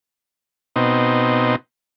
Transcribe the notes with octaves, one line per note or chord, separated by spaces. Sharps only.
B2 C4 D#4